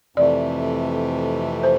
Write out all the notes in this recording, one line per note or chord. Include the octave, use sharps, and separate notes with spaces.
F2 C3 E3 A3 D5
C5